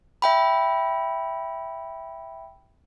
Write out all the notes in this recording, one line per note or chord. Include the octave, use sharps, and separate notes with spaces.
E5 G5 B5